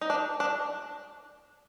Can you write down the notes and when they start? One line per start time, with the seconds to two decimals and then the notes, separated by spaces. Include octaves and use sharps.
0.01 D#4
0.10 D4
0.40 D4